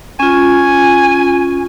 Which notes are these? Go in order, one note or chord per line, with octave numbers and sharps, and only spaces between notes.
C#4 F4 G#5